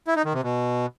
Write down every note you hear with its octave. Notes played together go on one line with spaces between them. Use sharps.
E4
D#4
D#3
C3
B2